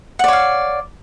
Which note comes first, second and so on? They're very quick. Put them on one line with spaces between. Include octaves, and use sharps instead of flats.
F#5 D5 C#5 F5